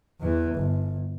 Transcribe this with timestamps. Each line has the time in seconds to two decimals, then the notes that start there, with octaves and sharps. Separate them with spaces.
0.20 E2 E3
0.55 G1